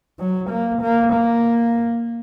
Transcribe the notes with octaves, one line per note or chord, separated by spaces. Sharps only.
F#3
A#3
A#3
A#3